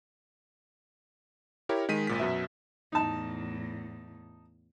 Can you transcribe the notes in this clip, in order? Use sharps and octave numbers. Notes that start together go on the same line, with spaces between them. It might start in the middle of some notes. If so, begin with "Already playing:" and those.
E4 G4 A#4 C#5
D#3 G#3 B6 D#7
G#1 A#2 B6
F#2 B2 E5
E2 A2 D#4 A5